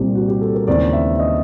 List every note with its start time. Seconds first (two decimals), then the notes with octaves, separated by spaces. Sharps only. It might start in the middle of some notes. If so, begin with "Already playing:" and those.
Already playing: C2 A#2 G3 C4 G4
0.15 F#4
0.28 G4
0.41 A4
0.55 A#4
0.67 D#2 C#3 E3 G#3 C4 D5
0.93 E5
1.19 D#5